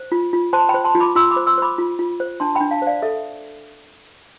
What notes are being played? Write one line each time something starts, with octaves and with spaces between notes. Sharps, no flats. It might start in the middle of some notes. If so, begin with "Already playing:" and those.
Already playing: C5
F4
F4
C5 A5 C6
G5 B5
C5
A5 C6
F4
B5 D6
F4 C6 E6
B5 D6
C5
C6 E6
C5 B5 D6
F4
F4
C5
D4 A5 C6
G5 B5
D4
F5 A5
C5 D5 F5
A4 E5